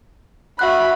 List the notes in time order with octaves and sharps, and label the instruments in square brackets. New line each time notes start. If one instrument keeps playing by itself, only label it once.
[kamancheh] F#4 B5 [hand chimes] E5 F#5 F#6